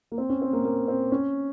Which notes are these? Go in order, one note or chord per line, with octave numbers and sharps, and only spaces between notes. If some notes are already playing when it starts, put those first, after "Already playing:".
A#3
C4
C#4
C4
A#3
A#3
C4
C#4